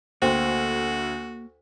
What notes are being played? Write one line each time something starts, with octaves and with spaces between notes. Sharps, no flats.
D2 A#3 F#4 C5 G5 C6